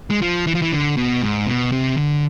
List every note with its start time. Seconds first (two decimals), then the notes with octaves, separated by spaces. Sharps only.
0.10 G#3
0.22 F3
0.47 E3
0.55 F3
0.62 E3
0.73 D3
0.97 B2
1.22 G#2
1.47 B2
1.72 C3
1.97 D3